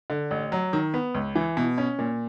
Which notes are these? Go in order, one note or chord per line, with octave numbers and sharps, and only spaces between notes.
D3
A1
F#3
D#3
B3
C#2
E3
B2
C#4
A#2